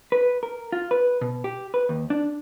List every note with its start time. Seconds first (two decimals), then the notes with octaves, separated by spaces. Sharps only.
0.12 B4
0.43 A#4
0.72 F4
0.91 B4
1.21 B2
1.44 G4
1.74 B4
1.89 D#2
2.10 D4